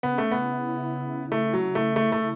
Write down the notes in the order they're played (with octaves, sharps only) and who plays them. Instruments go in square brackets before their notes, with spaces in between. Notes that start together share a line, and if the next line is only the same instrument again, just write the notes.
[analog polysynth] C#3 [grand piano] B3
[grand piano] A3
[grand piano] B3 [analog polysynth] E4
[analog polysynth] E4
C#3
[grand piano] A3 [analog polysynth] E4
[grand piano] F#3
[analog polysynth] E4
[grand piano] A3
[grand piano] A3 [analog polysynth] E4
[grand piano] A3